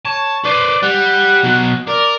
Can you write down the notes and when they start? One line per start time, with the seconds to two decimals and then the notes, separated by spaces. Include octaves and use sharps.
0.05 C#5 A5
0.45 B4 C5 D5
0.83 G3 F#5
1.44 B2 F#3
1.87 A#4 D5